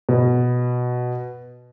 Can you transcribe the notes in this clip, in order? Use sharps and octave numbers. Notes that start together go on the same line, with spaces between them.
B2